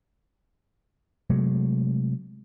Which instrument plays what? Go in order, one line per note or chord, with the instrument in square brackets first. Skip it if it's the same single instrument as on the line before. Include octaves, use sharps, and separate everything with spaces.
[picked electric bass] C3 F#3 G#3 A3